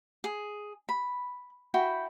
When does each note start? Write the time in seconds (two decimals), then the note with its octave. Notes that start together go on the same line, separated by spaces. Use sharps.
0.24 G#4
0.89 B5
1.74 E4 F#4 G5 B5